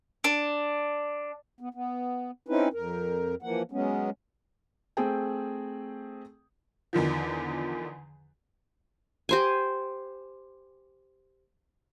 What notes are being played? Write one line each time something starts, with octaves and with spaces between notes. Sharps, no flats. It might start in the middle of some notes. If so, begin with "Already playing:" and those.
D4
B3
B3
C4 C#4 D#4 E4 B4
F2 A#4
E3 F3 A#3 F#5
F#3 G#3 B3 C#4
A3 C4 G#4 G5
E2 D3 D#3 F3
G4 C5 G#5